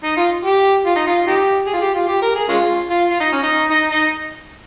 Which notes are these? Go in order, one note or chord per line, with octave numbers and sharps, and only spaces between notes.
D#4
F4
G4
F4
D#4
F4
D#4 G4
G#4
F4
G4
F4
G4
A#4
G#4
G#3 C#4 F4
F4
F4
D#4
C#4
D#4
D#4
D#4